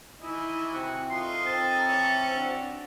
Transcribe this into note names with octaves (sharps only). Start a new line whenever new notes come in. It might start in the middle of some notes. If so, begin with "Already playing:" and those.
D#3 E3 E4 D#5 G#5
C3 F#4
D#4 F4 A4 A#4 C6
C4 A5
E3 C#4 E5 C#7
D4 F#4